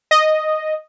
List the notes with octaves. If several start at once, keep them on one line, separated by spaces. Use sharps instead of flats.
D#5